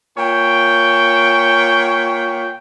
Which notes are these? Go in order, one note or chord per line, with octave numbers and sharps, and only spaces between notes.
A#2 C#5 G5